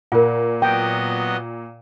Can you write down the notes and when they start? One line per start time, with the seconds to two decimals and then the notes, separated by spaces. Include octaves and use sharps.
0.12 A#2 F4 A#4 F#5
0.62 F#3 B3 D#5 G5